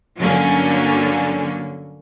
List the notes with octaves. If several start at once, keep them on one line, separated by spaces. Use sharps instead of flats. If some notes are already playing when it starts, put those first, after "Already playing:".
G2 D3 F#3 A#3 C#4